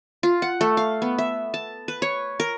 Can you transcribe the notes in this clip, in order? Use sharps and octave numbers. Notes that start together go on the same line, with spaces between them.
F4
F#5
A3
F5
B3
E5
A5
B4
C#5
A#4